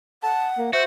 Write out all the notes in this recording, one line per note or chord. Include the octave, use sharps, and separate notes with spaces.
F#5 A5
A#3
F#4 C5 E5